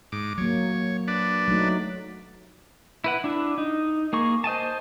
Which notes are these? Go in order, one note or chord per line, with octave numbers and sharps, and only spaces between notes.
G#2 D6
F#3 A#3 C#5
D4 B4 D5
F#3 A3 D#4
E4 B4 F#5
D4 E4
D#4
A#3 G#4 C#6
C5 D#5 G#5 A5